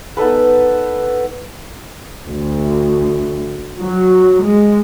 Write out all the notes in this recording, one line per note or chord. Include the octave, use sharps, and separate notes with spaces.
B3 D#4 A4 B4
D2
F#3
G#3